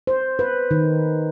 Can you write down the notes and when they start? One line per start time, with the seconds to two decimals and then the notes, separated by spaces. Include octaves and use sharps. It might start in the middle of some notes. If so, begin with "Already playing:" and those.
0.07 C5
0.39 B4
0.71 D#3